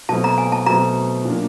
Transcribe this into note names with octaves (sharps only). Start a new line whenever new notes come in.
B2 F#3 A3 C4 A5
A#5
G#5
A5
B2 F#3 A3 C4 A#5
A#2 F#3 A#3 D4